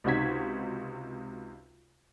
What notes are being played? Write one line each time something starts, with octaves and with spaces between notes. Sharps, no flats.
C#2 C3 D#4 F#4 G#6 B6